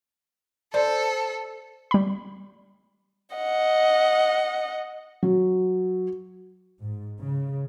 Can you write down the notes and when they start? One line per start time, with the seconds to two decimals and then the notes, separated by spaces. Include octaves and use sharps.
0.74 A4 C5 D5
1.91 G3 B5
3.35 D#5 F#5
5.23 F#3
6.81 G#2
7.21 C#3